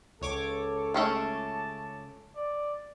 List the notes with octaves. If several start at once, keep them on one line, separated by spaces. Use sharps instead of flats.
C#2 A4 C#5 D6
A3 C#4 G#4 A5
D5